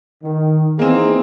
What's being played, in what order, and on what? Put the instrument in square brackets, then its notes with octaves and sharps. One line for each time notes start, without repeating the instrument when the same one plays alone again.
[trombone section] D#3
[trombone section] E3 D#4 G#4 [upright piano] A#3 C4